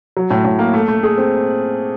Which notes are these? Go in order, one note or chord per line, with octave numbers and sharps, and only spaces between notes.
F#3
A2
A2
A#3
A3
A3
G#4
C4